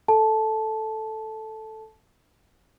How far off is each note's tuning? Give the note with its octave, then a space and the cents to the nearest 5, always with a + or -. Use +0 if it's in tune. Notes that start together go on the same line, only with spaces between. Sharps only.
A4 +0 A5 -15